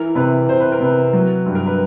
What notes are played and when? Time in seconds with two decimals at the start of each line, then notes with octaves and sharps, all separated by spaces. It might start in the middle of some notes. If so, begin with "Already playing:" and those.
Already playing: E3 A#4
0.15 C3 B4
0.49 C3 C5
0.60 B4
0.72 A#4
0.80 C3 B4
1.13 F#3
1.46 G2
1.55 A#4
1.67 B4